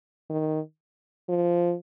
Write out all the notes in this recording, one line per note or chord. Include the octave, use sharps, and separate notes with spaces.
D#3
F3